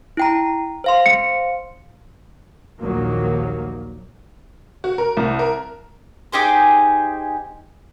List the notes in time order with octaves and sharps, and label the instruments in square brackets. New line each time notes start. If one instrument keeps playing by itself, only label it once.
[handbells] E4 G5 A#5
C5 F5 C6
[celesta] C#7
[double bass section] A#1 D#2 D#3 F#3 A#3
[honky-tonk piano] F#4
A#4
C2
A#4
[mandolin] D#4 G4 G#4 C5